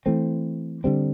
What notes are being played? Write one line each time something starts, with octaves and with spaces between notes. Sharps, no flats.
E3 A3 C4
D3 G3 C4